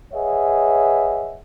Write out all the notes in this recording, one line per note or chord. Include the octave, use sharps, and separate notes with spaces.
G#4 B4 C#5 D#5 E5 F#5